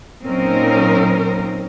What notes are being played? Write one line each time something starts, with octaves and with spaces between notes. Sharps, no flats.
A#2 F#3 C4 C#4 D#4 A#4